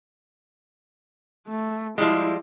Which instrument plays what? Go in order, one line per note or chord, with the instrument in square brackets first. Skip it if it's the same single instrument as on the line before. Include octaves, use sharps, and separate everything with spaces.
[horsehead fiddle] A3
[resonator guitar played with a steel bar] F3 G3 G#3 [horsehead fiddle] E4